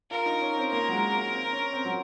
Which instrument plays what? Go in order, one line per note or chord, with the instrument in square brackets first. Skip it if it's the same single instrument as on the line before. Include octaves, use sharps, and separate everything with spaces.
[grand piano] F4 [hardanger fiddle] A#4
[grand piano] D#4
C#4
C4
[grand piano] A#3 [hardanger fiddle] A#4
[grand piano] F#3
G#3
A#3
C4
C#4
C4
F#3